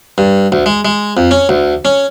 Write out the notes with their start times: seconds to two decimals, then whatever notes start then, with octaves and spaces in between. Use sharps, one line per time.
0.18 G2
0.52 D2
0.66 G#3
0.85 G#3
1.17 F2
1.31 C#4
1.49 D2
1.85 C#4